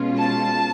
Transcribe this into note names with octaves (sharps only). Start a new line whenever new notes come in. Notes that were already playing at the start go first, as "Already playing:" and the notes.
Already playing: B2 G#3 C#4 F4
A5